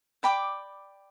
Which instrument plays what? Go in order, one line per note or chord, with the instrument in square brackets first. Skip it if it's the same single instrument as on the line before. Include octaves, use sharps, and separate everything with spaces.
[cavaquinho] D5 G5 B5 D6